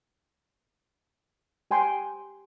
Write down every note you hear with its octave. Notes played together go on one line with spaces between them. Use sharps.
G4 G5 G#5 C6